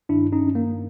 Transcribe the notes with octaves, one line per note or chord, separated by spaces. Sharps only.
G2 D#3 D4 E4
C#4 D#4
A#3